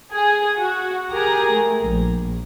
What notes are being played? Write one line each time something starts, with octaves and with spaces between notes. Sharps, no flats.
G#4
F#4
G4 G#4 A#4 A#5
A3
A#1